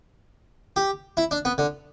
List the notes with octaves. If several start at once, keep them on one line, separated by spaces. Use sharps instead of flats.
G4
E4
D4
B3
D3